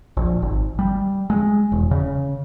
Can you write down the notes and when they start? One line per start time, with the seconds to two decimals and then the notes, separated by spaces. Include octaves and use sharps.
0.17 A#1
0.42 G#1
0.79 G3
1.30 G#3
1.72 E1
1.91 C#3